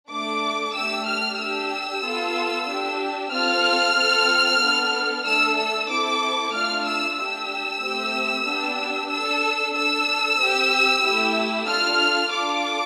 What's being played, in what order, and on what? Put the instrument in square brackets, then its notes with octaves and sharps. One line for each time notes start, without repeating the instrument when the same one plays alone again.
[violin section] A3 D4 A4 D6
A3 D4 G4 E6
F6
D4 G4 E6
B3 F4 A4
D4 G4
C4 F4 A4 F6
C4 F4 A4
B3 D4 A4
A3 D4 A4 E6
E6
C4 E4 A4 D6
A3 D4 F4 F6
E6
D4 G4 E6
A3 C4 G4
B3 D4 G4
D4 A4 E6
D4 A4 E6
C4 G4
A3 E4 G4
D4 F4 A4 F6
D4 F4 A4 D6